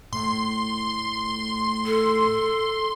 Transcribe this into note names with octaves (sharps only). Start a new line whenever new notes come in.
A2 C6
A4